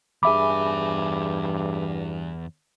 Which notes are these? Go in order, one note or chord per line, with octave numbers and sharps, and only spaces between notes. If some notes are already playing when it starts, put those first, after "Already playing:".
E2 G2 G#4 E5 G#5 B5 D6